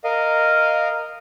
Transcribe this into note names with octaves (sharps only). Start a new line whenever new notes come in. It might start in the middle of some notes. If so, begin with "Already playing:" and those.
A#4 D#5 F5